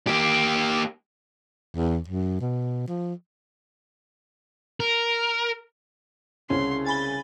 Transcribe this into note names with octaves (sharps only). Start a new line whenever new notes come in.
A#3 G4
E2
F#2
B2
F3
A#4
C2 C#3 C4 C#4 C6
G#5 B5 A6 G7